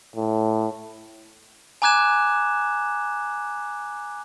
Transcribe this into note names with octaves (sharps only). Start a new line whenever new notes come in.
A2
G#5 A#5 D6 F#6 G#6 E7